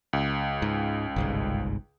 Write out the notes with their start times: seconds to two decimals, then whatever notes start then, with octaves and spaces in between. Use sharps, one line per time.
0.13 C#2
0.62 G#2
1.16 G1 C2 G#2